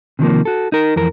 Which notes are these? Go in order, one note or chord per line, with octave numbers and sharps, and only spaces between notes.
C3 D#3 F3 A#3
F#4 A4
D#4 A#4
F2 E3 A#4